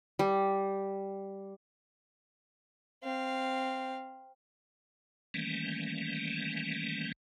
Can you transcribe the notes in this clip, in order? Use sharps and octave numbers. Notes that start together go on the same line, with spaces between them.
G3
C4 F5
D#3 E3 G3 A3 A#3 C#4